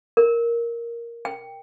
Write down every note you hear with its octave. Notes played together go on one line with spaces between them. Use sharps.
A#4
G5